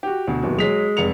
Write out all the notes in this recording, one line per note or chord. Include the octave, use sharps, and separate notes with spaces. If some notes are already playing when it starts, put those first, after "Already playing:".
F#4 G4
D2 B2
D1 D#2 B2
F#3 G#3 B6 F7
F1 C#7 F7